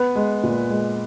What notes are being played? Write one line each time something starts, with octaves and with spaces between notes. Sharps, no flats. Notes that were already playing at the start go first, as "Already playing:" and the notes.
Already playing: B3 B4
G#3
A#2
G#3